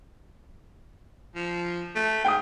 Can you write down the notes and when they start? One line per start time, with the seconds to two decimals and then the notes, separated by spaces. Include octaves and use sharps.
1.35 F3
1.95 A3
2.25 G#2 G5 D#6